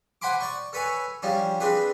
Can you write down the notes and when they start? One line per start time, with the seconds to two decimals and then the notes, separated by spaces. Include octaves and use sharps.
0.22 C5 F#5 G#5 B5 C6 D6
0.41 D5 C#6
0.73 A4 B4 C#5 G#5
1.22 F3 G3 C#4 D4
1.60 C4 D4 G#4 B4